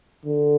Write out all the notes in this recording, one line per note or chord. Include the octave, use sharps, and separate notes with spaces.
D3